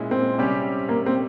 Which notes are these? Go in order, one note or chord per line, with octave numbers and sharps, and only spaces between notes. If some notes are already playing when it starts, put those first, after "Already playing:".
Already playing: A#2 G#3 C#4 E4
C4
C3 G3 C#4 G4 C5
A#3
C4